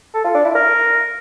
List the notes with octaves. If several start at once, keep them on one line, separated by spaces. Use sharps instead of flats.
A4
F4
D4
E4
A#4